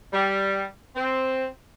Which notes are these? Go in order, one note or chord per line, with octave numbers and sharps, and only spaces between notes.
G3
C4